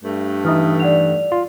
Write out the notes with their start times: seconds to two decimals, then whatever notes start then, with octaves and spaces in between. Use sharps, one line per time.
0.04 G2 A3
0.45 E3 D#4 E5 D#6 F6
0.80 D5 F#5 F7
1.32 F4